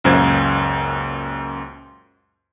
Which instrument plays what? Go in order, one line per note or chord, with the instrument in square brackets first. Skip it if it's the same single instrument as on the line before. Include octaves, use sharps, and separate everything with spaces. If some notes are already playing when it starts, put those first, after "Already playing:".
[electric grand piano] C#2 F#2 A#2 C5 G#6